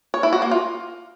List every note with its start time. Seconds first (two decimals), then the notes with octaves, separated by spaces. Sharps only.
0.14 C#5
0.23 E4
0.33 F#4
0.42 A#3
0.51 F4